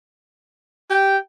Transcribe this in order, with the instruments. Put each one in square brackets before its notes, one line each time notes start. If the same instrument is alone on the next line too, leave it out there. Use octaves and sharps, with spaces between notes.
[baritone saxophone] G4 [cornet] G5